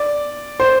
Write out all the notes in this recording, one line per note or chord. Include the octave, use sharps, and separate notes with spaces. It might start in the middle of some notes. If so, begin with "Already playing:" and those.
Already playing: D5
C5